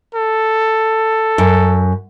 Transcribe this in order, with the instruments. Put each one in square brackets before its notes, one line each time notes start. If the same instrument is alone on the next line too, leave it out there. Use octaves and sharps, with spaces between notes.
[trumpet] A4
[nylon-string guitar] F#2